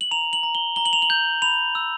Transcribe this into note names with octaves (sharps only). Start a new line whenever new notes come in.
F#7
A#5 F7
F#7
A#5
G7
A#5 G7
F#7
F7
F#7
G6
B5 F7
E6